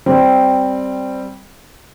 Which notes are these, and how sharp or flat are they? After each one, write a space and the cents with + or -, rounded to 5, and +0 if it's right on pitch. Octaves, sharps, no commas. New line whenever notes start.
G3 +0 C4 +0